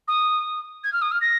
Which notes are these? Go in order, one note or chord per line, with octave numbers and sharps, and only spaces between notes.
D#6
G#6
F6
D#6
F6
A#6